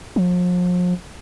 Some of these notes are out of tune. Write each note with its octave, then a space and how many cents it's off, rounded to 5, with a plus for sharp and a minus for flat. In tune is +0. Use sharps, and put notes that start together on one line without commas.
F3 +40